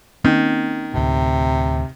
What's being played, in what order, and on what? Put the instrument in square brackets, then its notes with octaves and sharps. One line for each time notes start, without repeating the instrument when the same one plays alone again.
[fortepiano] D#3 [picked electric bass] A#3 C4 C#4
[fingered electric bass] D2 A2 [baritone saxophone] C3